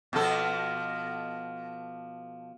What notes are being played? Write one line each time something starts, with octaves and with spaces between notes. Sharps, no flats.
B2 F3 A4